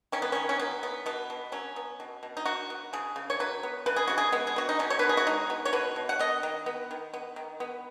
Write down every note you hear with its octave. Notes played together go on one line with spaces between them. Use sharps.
D#3 C#4
B3
D#3 C#4
C#4
F#3 B3
B3
B2 B3
B2
F#3 C#4
B3
B2
B2
D#4
F#3 F#4
B3
C#3 G#4
C#3
C#5
F#3 B4
B3
C#3 B4
G#4
C#3 F#4
G#4
G#3 B3
G#4
B3 F#4
D#4
B2 C#4
C#5
B4
B2
G#4
F#4
G#3 D#4
B3
C#5
B2 B4
B2
F#5
B3 D#5
D#3
B3
D#3
B3
D#3
B3